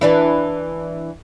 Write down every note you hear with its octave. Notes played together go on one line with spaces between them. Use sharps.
E3 D4 E4